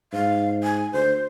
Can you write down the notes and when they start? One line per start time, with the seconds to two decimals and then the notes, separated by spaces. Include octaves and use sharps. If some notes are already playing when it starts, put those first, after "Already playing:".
0.13 G#2 F5
0.63 G#5
0.93 D2 C5